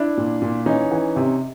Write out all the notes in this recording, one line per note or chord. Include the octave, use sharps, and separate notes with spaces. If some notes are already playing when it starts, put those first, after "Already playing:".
Already playing: D4 E4
A#2
A#2
E3 C#4 D#4
E3
C3